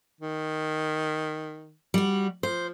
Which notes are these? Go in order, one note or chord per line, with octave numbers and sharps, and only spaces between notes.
D#3
G3 F#4
F3 C5